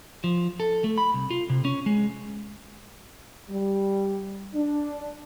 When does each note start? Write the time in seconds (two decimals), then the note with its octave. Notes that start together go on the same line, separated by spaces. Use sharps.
0.24 F3
0.60 A4
0.84 A3
0.98 B5
1.14 C2
1.30 F4
1.50 C3
1.65 C#4
1.86 G#3
3.50 G3
4.55 D4